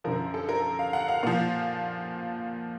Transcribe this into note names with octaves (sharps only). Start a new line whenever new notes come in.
F#2 D3 F3 A#4
A4
A#4
F5
F#5
F5
A#2 F3 F5